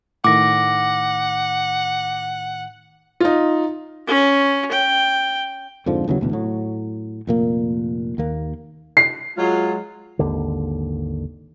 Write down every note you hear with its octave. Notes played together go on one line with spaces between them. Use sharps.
A2 D#3 F#5 D6 A#6
D#4 F4
C#4
G5
F2 G#2 D3 F3
D#2 C#3 E3 F#3
D2 B2 E3
A2 F#3
F1 A#2 A#3
D#2 A#3
C7
F#3 G#3 F4
G#1 D#2 D3